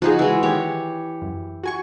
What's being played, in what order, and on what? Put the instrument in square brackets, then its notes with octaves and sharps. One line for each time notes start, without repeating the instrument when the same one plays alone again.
[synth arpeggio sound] F3 D#4 G#4 [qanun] F#4
[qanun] E3 G#3
[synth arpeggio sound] D#3 [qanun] G4 C#5
[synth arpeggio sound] F#2
F#4 G#5 C#6